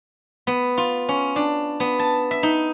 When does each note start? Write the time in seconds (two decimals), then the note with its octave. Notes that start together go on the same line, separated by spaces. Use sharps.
0.47 B3
0.78 F4
1.09 C#4
1.36 D4
1.80 B3
1.99 A5
2.31 E5
2.43 D#4